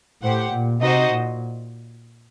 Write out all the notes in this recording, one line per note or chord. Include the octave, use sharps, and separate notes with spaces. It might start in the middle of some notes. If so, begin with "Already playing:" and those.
A2 G4 C5 F#5
A#2
C3 D#4 F#4 C5 D#5
A#2